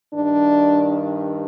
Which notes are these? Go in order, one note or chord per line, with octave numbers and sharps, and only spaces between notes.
G2 D#3 D4